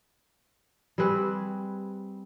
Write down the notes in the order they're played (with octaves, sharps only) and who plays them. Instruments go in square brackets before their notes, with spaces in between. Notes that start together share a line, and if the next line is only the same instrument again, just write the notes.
[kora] G3 C4 G#4 B4